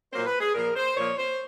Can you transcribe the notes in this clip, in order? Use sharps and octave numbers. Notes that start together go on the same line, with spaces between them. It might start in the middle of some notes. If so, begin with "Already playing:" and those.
A#2 F#3 A#3 C5
B4
G#4
A#2 F3 A#3 A#4
C5
A#2 F3 A#3 C#5
C5